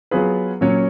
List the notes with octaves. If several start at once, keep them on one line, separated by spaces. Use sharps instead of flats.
F#3 B3 F4 G#4 B4
A#2 F#3 C#4